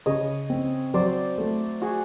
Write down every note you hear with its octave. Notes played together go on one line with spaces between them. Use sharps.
C#3 C#5 D#5
C4
F#3 C5 D5
A3
F#4 G#4